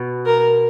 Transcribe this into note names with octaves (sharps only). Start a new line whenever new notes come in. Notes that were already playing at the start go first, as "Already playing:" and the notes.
Already playing: B2
A#4